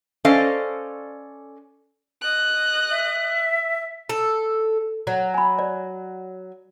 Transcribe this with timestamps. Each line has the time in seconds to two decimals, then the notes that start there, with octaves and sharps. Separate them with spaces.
0.25 C#4 A4 C5 D5 D#5 F5
2.21 D#5 F#6
2.91 E5
4.09 A4
5.07 F#3
5.34 G#5 B5
5.59 D5